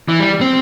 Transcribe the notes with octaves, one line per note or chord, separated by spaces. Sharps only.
E3
G3
C4